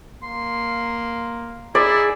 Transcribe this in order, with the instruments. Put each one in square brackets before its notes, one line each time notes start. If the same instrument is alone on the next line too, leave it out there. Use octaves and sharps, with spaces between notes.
[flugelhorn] A#3 [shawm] C6
[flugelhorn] D#4 [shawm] E4 [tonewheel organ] G#4 [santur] D5